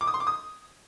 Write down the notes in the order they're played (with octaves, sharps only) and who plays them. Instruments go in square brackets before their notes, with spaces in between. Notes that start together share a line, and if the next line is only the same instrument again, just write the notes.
[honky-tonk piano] D6
D#6
C6
D6
D#6